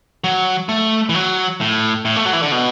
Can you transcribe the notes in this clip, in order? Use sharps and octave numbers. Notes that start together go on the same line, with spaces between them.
F#3
A3
E3
F#3
A2
A2
A3
F#3
E3
D3
B2